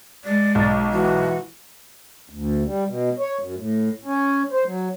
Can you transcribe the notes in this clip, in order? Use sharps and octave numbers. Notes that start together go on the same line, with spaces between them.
G#3 D5
B1
E3 F#4
D2
G3
B2
C#5
F#2
A2
C#4
C5
F#3